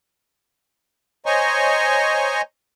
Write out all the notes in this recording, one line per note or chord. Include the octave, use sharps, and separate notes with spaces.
C5 C#5 D#5 G#5 A#5 C#6